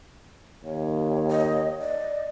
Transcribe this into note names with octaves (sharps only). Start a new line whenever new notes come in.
D#2 C#5
D#5
D5 D#5